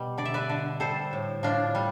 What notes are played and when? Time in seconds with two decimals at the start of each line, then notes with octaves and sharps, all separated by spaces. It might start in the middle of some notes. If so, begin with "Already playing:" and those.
Already playing: B2 G3
0.18 D3 D5
0.25 E5
0.34 B4 D5
0.49 D3
0.80 G3 A4 C5
1.13 A2
1.43 A2 D4 F4
1.75 G3